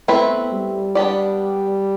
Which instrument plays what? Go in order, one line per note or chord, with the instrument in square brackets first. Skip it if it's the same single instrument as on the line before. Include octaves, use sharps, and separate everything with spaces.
[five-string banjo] A3 C4 E4 B4 [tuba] B3
[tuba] G3
[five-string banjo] B3 D4 G4 D5